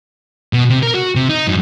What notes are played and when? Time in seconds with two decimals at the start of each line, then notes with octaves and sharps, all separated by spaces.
0.53 B2
0.70 C3
0.83 A#4
0.95 F#4
1.15 C3
1.29 D#4
1.47 F#2